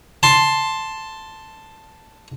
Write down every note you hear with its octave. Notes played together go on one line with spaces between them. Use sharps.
A5 C6